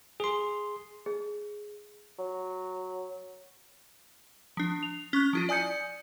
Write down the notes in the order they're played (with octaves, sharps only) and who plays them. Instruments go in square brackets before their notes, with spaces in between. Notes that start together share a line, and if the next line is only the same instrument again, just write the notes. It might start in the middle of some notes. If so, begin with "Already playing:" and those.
[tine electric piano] G#4 C6
[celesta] G#4
[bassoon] F#3
[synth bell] F3 D4
F7
C#4 C#6 F#6
F3 E4 F4
D5 G#5 D#6 G6 C#7